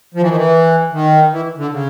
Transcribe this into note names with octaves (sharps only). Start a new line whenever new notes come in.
F3
E3
D#3
E3
D#3
E3
D3
C#3